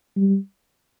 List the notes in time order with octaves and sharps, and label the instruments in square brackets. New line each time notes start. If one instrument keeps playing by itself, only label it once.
[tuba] G3